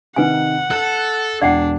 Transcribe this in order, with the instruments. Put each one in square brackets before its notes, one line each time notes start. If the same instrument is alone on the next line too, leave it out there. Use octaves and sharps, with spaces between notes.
[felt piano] C3 D#3 D#4 [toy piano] B4 G#5 [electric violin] F#5
[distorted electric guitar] A4 [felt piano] F#6
[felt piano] E1 E2 [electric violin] D4 [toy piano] D5 F#5 G5